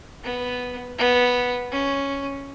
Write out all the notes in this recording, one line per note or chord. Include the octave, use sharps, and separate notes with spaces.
B3
B3
C#4